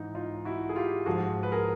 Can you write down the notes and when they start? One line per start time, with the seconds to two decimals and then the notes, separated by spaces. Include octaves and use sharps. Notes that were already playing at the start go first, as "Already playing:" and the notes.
Already playing: G#2 E3 D#4
0.15 D#4 F4
0.45 E4 F#4
0.69 G#4
0.76 F4 G4
1.06 G#2 F3 F#4 G#4
1.43 B4
1.52 G#4 A#4